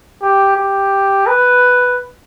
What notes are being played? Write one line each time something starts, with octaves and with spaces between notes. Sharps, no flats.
G4
G4
B4